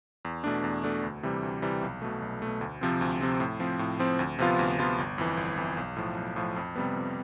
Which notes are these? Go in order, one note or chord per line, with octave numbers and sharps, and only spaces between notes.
E2
B2 A3 D4
E2
B2 A3 D4
D2
C3 E3 G3
D2
C3 E3 G3
B1
B2 A3
B1
B2 A3
D2
C3 F3 C4
D2
C3 F3 C4
A2
F3 C4
A2
F3 C4
D2
C3 F3 B3 F4
D2
C3 F3 B3 F4
G1
F2 E3
G1
F2 E3
B1
A2 F3
B1
A2 F3
F2
C3 G3 B3
F2